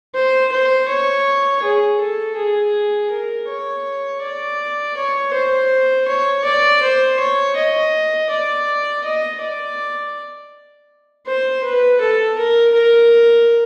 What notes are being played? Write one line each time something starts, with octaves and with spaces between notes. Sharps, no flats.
C5
C5
C#5
G#4
A4
G#4
A#4
C#5
D5
C#5
C5
C#5
D5
C5
C#5
D#5
D5
D#5
D5
C5
B4
A4
A#4
A#4